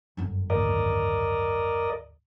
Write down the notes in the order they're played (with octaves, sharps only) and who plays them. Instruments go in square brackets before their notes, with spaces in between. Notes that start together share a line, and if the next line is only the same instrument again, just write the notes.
[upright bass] G1 F#2
[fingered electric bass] G#1 D2 [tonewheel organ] A#4 D5 D#5